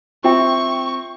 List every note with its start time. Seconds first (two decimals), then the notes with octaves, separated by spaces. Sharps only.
0.24 C4 F4 E5 G5 C#6